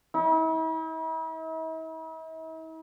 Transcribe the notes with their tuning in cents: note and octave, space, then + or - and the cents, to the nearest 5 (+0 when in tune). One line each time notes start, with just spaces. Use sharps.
E4 -45